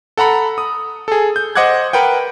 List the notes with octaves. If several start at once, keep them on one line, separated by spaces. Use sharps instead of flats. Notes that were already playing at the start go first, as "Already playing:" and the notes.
A4 F#5 A#5 B5
D#6
G#4 A4
G6
C5 D#5 F#5 D6 F#6 G#6
A#4 B4 F#5 G5